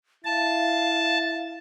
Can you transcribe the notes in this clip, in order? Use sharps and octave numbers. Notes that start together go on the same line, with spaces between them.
E4 F5 A5